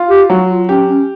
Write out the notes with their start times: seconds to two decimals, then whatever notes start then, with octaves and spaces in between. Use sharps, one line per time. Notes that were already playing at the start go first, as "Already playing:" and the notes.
Already playing: F4
0.09 G4
0.29 F#3 F#4
0.49 F4
0.69 C#4 G4
0.88 C#4